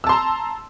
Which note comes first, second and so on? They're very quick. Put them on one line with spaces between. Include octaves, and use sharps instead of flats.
E6 A5 C6 A#5